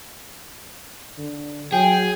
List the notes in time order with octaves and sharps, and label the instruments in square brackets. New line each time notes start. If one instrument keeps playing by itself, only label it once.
[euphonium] D3
[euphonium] F#3 [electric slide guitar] G#4 [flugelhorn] G5